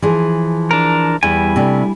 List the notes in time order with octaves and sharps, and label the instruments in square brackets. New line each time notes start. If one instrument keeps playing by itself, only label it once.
[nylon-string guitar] E3 F3 G#4
[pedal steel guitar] D4 A#4
[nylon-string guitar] E2 [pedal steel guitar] G3 E4 G#5
[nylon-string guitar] C3 A3 D4